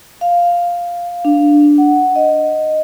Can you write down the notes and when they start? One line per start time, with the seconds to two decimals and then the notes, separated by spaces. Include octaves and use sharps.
0.21 F5
1.25 D4
1.78 F#5
2.16 D#5